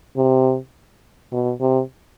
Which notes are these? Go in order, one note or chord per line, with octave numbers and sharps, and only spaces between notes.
C3
B2
C3